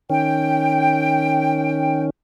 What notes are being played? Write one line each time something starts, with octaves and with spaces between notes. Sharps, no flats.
D#3 C#4 G5